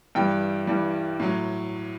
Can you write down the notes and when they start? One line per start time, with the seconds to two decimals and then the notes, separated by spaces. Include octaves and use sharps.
0.15 G2 E3 G3 G5
0.67 G2 E3 G3
1.20 A2 F#3